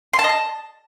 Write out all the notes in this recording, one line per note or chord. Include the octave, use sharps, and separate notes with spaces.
C6
A5
D#5
A5